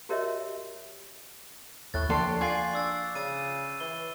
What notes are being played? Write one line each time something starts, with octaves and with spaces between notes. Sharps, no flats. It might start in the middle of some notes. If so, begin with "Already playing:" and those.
F#4 G4 A#4 C#5 D#5 E5
D#2 A2 C#6 F#6 A6
F3 A#3 D4 G4 A4 C6
F4 D5 G#5 G#6 A6 C7
D4 D6 E6 A6
C#3 E6 A6 D#7
E3 G7